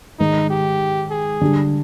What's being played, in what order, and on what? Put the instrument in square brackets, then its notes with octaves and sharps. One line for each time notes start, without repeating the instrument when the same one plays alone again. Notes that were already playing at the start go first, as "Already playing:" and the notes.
[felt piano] G#2 D#3 G#3 [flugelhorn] D#4
[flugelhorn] G4
G#4
[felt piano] D3 G3 D4